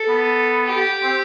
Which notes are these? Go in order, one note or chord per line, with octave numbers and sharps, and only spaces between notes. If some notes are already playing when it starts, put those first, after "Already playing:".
Already playing: A4
B3
G4
C4